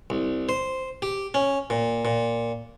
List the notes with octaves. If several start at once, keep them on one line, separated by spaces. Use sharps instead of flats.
C2
C5
G4
C#4
A#2
A#2